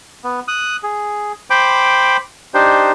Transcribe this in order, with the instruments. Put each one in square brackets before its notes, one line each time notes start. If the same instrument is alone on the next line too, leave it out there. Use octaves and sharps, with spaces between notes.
[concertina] B3
D#6 F#6
G#4
C5 G5 B5 D6
D4 D#4 G4 C5